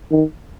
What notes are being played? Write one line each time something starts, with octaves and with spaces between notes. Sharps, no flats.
D#3